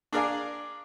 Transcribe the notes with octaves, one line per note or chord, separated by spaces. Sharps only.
D4 G#4 A#4 D5 F5 G#5